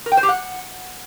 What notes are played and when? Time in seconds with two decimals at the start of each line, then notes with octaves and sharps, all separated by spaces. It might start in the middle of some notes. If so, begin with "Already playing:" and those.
0.06 A#4
0.12 G5
0.17 C5
0.23 G4
0.29 F#5